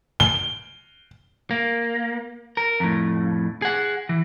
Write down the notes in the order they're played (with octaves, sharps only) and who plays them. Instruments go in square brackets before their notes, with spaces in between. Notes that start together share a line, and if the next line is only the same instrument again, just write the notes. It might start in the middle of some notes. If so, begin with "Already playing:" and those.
[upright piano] G7
[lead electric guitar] A#3
A#4
F2 A2
G#4 F#5
E3